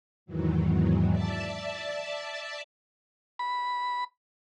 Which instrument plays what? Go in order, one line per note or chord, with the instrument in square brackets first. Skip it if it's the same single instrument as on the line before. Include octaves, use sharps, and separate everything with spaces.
[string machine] E2 G#2 D#3 E3 F#3
D5 E5 A5
[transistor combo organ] B5